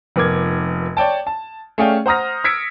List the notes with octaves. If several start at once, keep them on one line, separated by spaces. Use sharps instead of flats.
F1 B3 A#4 D6 G#6
C#5 D5 G5 A5
A5
A3 C#4 G#4 D5 F5 G5
C5 F#5 A#5 D#6 F6 A#6
E6 G#6 A#6 B6 C#7 D7